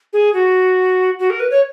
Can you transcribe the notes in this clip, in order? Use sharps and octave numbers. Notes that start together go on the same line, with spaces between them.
G#4
F#4
F#4
A#4
B4
C#5